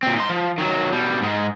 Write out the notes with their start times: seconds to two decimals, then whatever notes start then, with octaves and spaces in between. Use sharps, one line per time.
0.03 A#2 C4
0.16 D#4 C6
0.30 F3
0.58 D#3 F#3
0.93 B2 G3
1.22 G#2 G#3